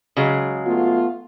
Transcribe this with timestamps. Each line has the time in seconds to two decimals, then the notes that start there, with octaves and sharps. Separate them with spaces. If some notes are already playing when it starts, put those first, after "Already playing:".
0.16 C#3 F#3 G#3
0.66 A3 B3 F4